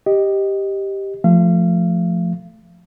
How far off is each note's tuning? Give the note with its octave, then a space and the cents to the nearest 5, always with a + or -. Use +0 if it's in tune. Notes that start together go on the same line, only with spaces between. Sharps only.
G4 +0 D#5 +0
F3 +0 A3 +0 F5 -40